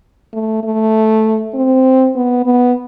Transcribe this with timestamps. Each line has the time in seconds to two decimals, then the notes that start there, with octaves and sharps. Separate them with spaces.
0.33 A3
0.63 A3
1.54 C4
2.15 B3
2.46 B3